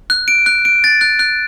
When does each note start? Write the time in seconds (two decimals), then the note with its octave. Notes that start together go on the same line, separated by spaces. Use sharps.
0.10 F#6
0.28 D7
0.46 F#6
0.65 D7
0.84 A6
1.01 F#6
1.19 F#6